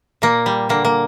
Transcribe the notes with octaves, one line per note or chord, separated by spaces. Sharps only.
A#2 A#3
G3
D3 A#3
A#3